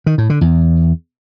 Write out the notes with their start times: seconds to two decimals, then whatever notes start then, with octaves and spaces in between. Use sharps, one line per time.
0.06 D#3
0.18 A2
0.30 D3
0.41 E2